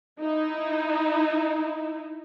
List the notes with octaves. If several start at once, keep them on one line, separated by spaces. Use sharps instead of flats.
D#4 E4